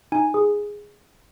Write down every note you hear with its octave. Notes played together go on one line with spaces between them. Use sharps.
D#4 G#5
G#4